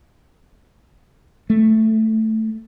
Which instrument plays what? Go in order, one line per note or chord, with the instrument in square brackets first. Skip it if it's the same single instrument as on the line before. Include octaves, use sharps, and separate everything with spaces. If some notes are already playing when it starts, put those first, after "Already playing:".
[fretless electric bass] A3